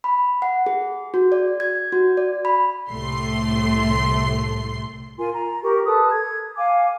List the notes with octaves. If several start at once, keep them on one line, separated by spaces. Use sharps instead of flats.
B5
F#5
G#4
F#4
D5
G#6
F#4
D5
B5
C2 A2 A3 C6 C7
F4 A#4 G#5 C6
A#5
G4 A#4 C#6
A4 B4 A5 D#6
G#6
F5 G#5 D6